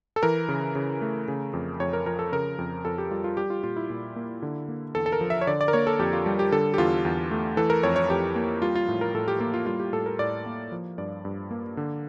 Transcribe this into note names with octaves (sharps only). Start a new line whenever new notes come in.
A4
E3 A#4
C#3
C#3
A3
C#3
F2
F2 C#5
A#4
F3 A#4
A4
C#3 A#4
F2
F2 A4
G4
G3 F4
F4
G3 G4
F4
A#2 F4
E4
A#2
A#3
D3
A#3
E2 A4
A4
A#4
F3
E5
C#5
D3 D5
D5
A#4
A#3 C#5
A4
F2 G4
F4
G3
G4
D3 A4
G4
E2 F4
E2
A3
E3 A4
A#4
F2 C#5
C#5
F2 G4
A#3
G3 F4
F4
A2
A#4
A2 A4
G4
A#3 G4
F4
G3 F4
G4
A2 A4
A#4
A2 D5
A#3
F3
G2 D5
G2
A#3
D3